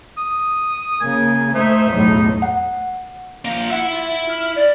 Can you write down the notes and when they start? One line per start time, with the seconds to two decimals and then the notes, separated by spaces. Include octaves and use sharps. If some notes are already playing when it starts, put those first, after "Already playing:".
0.17 D#6
1.01 C#3 A#3 G#5
1.54 A3 D#4 C5 E5
1.92 B1 E2 A2
2.42 F#5
3.45 F3 A#3
3.70 E4 E5 F#5
3.91 F4
4.28 F6
4.55 D5